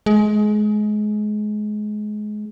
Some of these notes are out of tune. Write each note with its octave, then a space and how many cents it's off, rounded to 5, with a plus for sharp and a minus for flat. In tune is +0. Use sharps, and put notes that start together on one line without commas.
G#3 +25